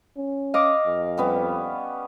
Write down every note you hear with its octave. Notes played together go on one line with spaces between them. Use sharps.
C#4
D#5 F5 D6
F2
G3 B3 C#4